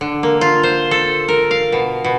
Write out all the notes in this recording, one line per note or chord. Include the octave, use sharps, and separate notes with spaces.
D3
A#3
F4
C5
A4
A#4
F5
B2
B2